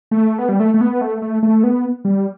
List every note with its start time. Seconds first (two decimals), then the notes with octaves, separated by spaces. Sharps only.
0.11 A3
0.39 B3
0.49 G3
0.60 A3
0.74 A3
0.81 B3
1.01 A3
1.22 A3
1.43 A3
1.64 B3
2.05 G3